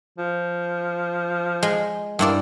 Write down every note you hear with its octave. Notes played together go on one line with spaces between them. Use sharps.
F3
G#3
G2 A#3 E4 D5